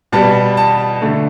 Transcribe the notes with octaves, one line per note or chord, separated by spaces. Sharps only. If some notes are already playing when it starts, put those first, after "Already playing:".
B2 G3 B3 A5
A5
D3 A3